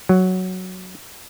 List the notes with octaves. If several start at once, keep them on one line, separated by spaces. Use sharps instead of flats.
F#3